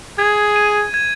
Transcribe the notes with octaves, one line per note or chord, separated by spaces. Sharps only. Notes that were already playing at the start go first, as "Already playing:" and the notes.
G#4 G#6
D#7
G#6